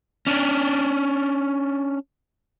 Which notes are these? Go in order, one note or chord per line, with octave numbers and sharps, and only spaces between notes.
C#4 D4